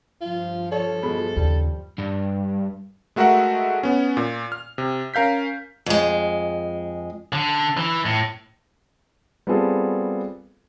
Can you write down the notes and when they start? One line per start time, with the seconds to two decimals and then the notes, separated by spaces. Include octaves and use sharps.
0.21 G2 F3 F4
0.72 A4 C#5
1.03 B2 G#3 B5
1.36 D#2 C#3 G3
1.99 G2
3.16 G#3 A3 F#4 A#4 E5 F#5
3.83 B3 C#4
4.17 A#2
4.52 F6
4.78 C3
5.14 C#4 A#4 F5 G6 B6
5.86 F2 G#3
7.33 D3
7.77 E3
8.06 A2
9.47 G3 B3 C4 F4 G#4 A4